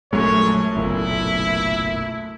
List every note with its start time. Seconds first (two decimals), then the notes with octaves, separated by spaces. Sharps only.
0.13 A#1 F#2 F#3 G#3 A3 C#5
0.76 F#1 B1 A#2 E4